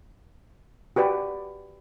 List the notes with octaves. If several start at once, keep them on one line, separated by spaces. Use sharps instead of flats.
F#4 G4 B4 D5